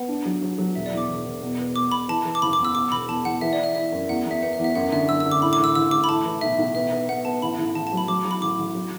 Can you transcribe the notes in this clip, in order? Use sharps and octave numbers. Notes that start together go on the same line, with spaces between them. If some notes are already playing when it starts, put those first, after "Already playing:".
Already playing: B3 F#5
D4
F#3
F#3
F#3
E1 E5
D5
E2 D6
E1
E1
B2
B3
B2 D6
B2 B5
E3 A5
E3
D6
F#1 B5
D6
E2
E6
B2 D6
E1 B5
E2 A5
E2 F#5
E3 E5
D5
E4
E5
E4 E5
F#2
E2 F#5
E2 E5
B3 F#5
E5
E2
E5
F#2 F#5
D3 E5
F#2 E6
D3 E6
D6
A2 B5
D6
A1 E6
A1 E6
A1 D6
B5
A2 A5
E3
B1 E5
B1
B3 E5
B3
B3 F#5
B3 A5
A1 B5
A1
A1 A5
A5
F#3 B5
F#3 D6
F#3
B5
A1 D6
A1
F#3